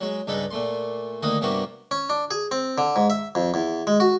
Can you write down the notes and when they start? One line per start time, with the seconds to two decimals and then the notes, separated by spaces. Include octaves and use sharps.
0.01 F#3 G#3
0.27 C#2 G2 G#3 D#4 A4 B4
0.51 A#2 A3 C6
1.22 D2 D#3 A#3 D#5 F#5 D#6
1.41 G2 C3 A#3 B3 F#4 G4
1.91 C#4
2.10 D4
2.31 G#4
2.51 C4
2.78 D3
2.96 G#2
3.10 E5
3.35 F2
3.54 E2
3.87 G#3
4.00 F#4